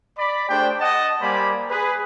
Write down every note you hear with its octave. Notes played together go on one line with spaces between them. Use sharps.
D5 B5
A3 D4 G4 G#4 C5 G5
D#5 F#5 A5
G3 A#3 C5 D5 G#5 B5
G#4 B4